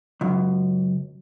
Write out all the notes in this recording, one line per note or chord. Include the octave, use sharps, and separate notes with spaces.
C#2 F#2